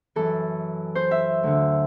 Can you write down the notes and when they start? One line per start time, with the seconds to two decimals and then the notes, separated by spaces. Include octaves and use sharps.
0.16 F#2 E3 A4
0.95 C5
1.11 E5
1.44 D2 D3